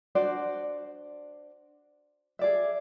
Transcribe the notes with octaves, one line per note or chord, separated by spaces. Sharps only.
D4 F#4 C5 D5
G#4 D5 E5